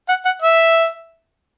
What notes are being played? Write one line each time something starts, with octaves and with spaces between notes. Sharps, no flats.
F#5
F#5
E5